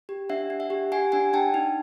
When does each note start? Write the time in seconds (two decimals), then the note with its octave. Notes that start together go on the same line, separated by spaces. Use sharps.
0.09 G4
0.29 D4 E5 F#5
0.50 D4
0.60 E5 F#5
0.70 G4
0.92 G4 F#5 G#5
1.12 D4 F#5 G#5
1.33 D4 G5 A5
1.54 D#4